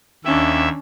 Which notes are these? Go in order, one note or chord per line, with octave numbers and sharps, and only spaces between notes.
D#2 C#4 D4 E5